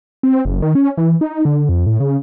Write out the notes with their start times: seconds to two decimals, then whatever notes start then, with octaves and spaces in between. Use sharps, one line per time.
0.23 C4
0.45 F#1
0.62 D#3
0.75 C#4
0.97 E3
1.21 D#4
1.45 D3
1.69 F2
1.86 A2
2.00 C#3